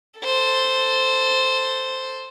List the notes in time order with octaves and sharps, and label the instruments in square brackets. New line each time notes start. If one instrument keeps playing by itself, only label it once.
[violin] A4 C5